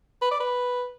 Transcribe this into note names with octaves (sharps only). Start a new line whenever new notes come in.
B4
D5
B4